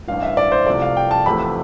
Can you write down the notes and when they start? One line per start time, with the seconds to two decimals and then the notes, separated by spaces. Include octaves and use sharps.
0.07 A1 G2 E3 F5
0.23 E5
0.37 D5
0.52 C5
0.67 C2 C3 F3 A3 D5
0.82 F5
0.97 G5
1.11 A5
1.26 F1 E2 C3 F3 A3 B5